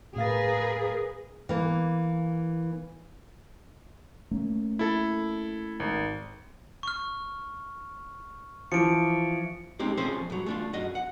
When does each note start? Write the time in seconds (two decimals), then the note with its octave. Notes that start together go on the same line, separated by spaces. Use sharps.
0.16 A2 G#4 A#4 B4 F5 A6
1.49 E3 A#3
4.31 A3 A#3 C#4
4.79 E4 A4
5.80 G#1
6.83 C#6 F6
8.72 E3 F3 C#7 D7
9.79 G#3 C4 C#4 D#4 G4
9.97 F3 C4 C#4 G#4 A4 C5
10.30 G2 F#3
10.46 A3 D4 F4
10.73 F#2 F#4 D#5
10.95 F#5